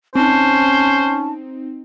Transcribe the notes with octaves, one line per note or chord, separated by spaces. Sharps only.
C4 C#4 D#4 C5 A5